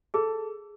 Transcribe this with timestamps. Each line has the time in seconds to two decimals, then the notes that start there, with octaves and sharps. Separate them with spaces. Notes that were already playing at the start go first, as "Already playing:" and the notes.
0.14 G#4 A4